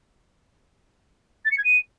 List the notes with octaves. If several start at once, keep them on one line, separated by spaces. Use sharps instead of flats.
A6
C#7
G#6
D#7